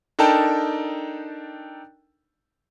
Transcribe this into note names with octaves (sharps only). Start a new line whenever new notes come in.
D4 D#4 A4 A#4 G5 A5